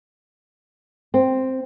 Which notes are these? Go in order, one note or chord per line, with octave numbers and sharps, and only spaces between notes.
C4